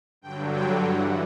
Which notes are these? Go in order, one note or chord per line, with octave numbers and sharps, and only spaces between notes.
G2 D3 F#3 G5
G5
G2 E3 F#5